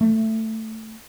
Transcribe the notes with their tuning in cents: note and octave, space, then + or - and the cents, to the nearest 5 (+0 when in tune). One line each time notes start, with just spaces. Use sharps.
A3 +10